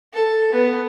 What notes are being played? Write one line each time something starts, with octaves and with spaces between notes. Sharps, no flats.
A4
B3